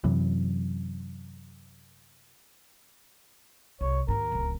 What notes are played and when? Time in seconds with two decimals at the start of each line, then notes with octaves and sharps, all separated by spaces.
0.04 F#2 C3 E3 F#3
3.81 C2 C#5
4.08 D#2 G#2 A#4
4.32 D1 C#2